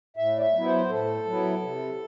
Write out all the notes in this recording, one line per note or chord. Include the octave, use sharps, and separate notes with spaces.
A2 E5
D5
E5
F#3 B3 E4
C5
A2 A4
F#3 B3 E4
C3